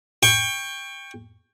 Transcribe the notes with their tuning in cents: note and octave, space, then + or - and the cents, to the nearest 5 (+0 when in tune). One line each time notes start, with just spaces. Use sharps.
G5 +20 C#6 +0